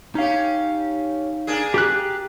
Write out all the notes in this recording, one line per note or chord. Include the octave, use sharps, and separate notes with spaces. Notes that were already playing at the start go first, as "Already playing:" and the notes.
C#4 D#4 G4 F5
A#3 D4 G#4
G4 F#6